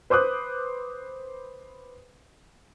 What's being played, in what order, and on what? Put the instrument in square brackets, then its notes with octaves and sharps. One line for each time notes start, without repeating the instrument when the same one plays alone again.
[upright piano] B4 C5 D6 D#6 F#6